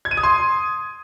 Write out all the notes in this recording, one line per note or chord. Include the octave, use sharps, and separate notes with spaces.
G#6
D#7
D#6
C6